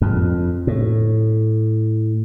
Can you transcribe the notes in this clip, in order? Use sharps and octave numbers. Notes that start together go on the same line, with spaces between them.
F2
A2